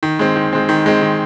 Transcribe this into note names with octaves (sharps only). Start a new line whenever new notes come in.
D#3
G#3 C4
D#3
G#3 C4
D#3
G#3 C4
D#3